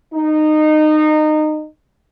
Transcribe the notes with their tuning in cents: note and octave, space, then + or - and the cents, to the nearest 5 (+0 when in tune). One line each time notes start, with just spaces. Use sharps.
D#4 -20